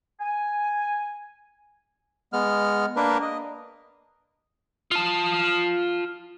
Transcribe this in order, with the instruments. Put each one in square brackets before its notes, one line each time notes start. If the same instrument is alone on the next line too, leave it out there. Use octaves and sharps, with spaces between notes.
[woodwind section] G#5
[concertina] G#3 B3 F6
A#3 D4 A#4 B4
D#5
[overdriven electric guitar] F4 A5